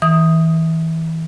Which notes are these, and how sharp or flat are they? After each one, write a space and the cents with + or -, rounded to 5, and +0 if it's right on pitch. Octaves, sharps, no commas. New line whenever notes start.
E3 -30 D#6 +0